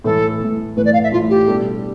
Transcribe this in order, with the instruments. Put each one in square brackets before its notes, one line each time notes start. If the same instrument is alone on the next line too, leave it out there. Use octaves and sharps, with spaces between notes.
[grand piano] A2 E3 A3 [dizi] A4
[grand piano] A2 E3 A3
[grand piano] A2 E3 A3 [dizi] B4
[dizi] D5
F5
E5
[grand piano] A2 E3 A3 [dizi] F4
[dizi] G4
[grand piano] B2 G3 D4 A4